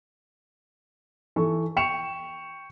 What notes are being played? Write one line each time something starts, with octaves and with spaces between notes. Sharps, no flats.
E3 A4 C#6
G5 C#6 C#7 E7 F7